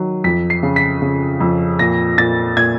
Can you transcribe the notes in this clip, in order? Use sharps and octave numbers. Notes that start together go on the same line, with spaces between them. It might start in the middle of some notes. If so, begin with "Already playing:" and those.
Already playing: D#3 F#3
F2 B6
C7
C#3
B6
C#3
F2
A#2 A#6
A#2 A6
A#2 G#6